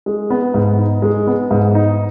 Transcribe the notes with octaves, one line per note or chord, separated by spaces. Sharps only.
G#3
B3
G#2
D#4
G#3
B3
G#2
D#4